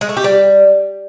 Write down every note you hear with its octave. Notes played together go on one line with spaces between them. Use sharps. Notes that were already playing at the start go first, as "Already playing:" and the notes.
G#3
A3
G4
G3